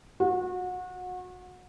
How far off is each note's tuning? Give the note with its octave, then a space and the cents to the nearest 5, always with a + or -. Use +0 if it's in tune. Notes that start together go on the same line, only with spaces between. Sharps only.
F#4 -30